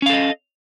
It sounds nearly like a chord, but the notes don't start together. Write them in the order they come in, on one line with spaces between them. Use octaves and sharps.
C#4 F5 A4 D#5